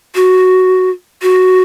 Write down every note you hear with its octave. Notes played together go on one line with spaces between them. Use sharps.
F#4
F#4